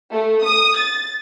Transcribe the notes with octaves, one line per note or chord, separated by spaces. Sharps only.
A3
D#6
A6